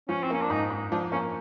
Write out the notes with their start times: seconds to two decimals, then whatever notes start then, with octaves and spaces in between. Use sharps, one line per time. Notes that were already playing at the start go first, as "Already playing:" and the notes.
0.09 F3 C#4
0.23 C4
0.30 A#3 C#4
0.41 D4
0.50 G#2 D#4
0.70 G#2
0.92 F3 D4
1.12 A#3 C#4